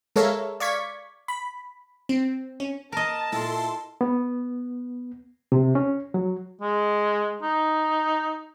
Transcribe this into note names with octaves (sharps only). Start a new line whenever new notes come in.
G#3 A4 A#4 C#5 E5 F5
D5 F5 C#6 G#6 B6
B5
C4
C#4
A#4 D#5 A5
A#2 E4 A4 C6
B3
C3
C#4
F#3
G#3
D#4